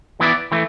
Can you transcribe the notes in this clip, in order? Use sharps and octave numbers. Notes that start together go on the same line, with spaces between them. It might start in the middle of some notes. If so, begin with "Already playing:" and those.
E3 B3 E4 B4 D5
E3 A3